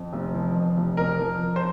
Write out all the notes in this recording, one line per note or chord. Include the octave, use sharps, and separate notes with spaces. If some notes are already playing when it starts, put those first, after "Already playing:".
Already playing: F2
F1
F3
F2
F1
F2 A#4
F3
F3
C5